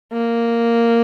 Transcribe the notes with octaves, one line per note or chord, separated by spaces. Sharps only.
A#3